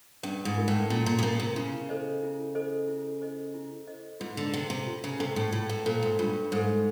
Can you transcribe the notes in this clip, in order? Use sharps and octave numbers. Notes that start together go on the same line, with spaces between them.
G2 C#4
G#2
F4 A#4
A2
A#2 C#4
A#2
B2
A#2 F4 A#4
C3
C#3 E4
A4 C5 D#5
E4
A4 C5 D#5
E4
A4 C5 D#5
E4
A4 C5 D#5
G#2 F4
D3
C3 A4 C5
C3
F4
C#3
C3 A4 C5
A2
A2 F4
A2
A#2 A4 C5
G#2
G2 F4
G#2 A4 C5